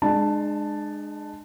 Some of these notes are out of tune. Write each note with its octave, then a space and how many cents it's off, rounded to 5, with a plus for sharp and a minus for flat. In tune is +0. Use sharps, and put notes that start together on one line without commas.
G#3 +0 D4 +35 A5 +0